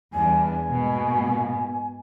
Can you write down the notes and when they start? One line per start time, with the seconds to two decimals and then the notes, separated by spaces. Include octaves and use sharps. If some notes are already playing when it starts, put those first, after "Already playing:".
0.13 E2 G3 D4 G#5
0.69 G#2 B2 A#3